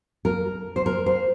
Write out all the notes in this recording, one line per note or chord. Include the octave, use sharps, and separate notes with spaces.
A#4
C5
A#4
C5